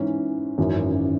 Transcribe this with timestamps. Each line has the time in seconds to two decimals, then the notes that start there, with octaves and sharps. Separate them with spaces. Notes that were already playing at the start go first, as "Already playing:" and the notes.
Already playing: G#2 E3 C#4
0.58 G#1 F#2 E3